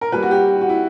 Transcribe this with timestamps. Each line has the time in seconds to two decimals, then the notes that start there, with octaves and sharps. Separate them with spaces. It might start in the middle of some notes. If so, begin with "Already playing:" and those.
0.01 A#4
0.12 A#2 G3 B4
0.23 F#4
0.31 G4
0.61 F#4
0.69 E4